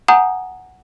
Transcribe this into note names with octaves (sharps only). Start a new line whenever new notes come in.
F#5 G#5 A#5 D#6 G6